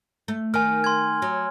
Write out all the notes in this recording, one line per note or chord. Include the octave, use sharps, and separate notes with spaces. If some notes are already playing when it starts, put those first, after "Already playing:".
A3
D#3 G#5 F6
C6 G#6
F#3